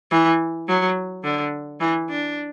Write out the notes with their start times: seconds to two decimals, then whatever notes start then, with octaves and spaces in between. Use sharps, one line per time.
0.11 E3
0.68 F#3
1.24 D3
1.80 E3
2.09 D4